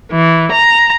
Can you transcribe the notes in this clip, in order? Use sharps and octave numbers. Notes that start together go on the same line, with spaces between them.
E3
A#5